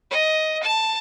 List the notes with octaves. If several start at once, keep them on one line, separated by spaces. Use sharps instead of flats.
D#5
A5